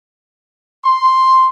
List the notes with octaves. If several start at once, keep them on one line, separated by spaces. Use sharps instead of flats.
C6